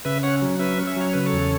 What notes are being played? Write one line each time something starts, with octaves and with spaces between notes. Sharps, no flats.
C#3 B4 E5
C#4 C#5 F#5
F#3
C#4 B4 E5
C#4
E5
F#3 C#5
C#3 B4
A4 C#5
E2